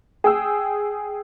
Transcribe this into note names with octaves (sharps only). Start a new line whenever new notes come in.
G#4 G5 E6